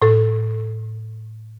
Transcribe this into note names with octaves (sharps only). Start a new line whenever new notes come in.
A2 A4